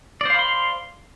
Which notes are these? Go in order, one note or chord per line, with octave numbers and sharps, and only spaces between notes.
C5 D5 F5 B5 C6